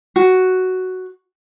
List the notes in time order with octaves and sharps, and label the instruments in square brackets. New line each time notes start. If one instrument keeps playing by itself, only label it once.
[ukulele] F#4